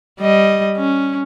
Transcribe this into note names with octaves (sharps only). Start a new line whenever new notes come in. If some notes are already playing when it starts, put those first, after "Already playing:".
G3 D#5
C#4